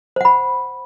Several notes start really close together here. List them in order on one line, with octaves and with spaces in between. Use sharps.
C5 F#5 B5